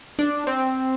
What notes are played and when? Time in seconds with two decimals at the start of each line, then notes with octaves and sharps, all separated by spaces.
0.19 D4
0.47 C4